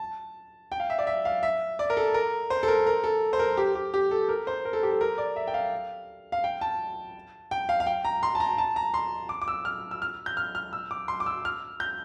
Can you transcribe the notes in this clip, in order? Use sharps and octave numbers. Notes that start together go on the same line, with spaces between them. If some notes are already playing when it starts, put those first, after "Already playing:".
Already playing: A5
G5
F5
E5
D5
E5
F5
E5
D5
A#4
A4
A#4
C5
A4
A#4
A#4
A4
C5
A#4
G4
G4
G4
A4
A#4
C5
A#4
A4
G4
A4
A#4
D5
E5
G5
F5
F5
G5
A5
G5
F5
F5
G5
A#5
C6
A5
A#5
A5
A#5
C6
D6
D6
E6
F6
E6
F6
G6
F6
F6
E6
D6
C6
D6
E6
F6
G6